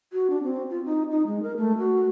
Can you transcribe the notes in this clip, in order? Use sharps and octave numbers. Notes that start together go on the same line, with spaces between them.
F#4
D4
C4
F4
D#4
D#4
G#3
A#4
A3
F#4